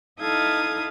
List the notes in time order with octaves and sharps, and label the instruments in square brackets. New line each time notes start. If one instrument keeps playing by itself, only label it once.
[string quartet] D#4 E4 A4 F5 D#6 G#6